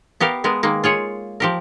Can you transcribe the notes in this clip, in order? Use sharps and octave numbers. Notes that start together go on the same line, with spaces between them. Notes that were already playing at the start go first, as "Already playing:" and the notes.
B3 G4 A#4 F5
G#3 B3 A#4
D#3 G#3 A#3
F4 G#4 C#5
F3 G4 A#4